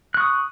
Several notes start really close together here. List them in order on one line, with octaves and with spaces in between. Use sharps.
F#6 C#6 D#6